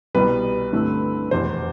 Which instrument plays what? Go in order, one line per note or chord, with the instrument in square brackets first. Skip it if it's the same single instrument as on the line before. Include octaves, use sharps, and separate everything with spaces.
[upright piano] C2 B2 G3 B3 [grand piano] B4
[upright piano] G2 D3 A3 C4 E4
[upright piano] F1 E2 B2 [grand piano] C5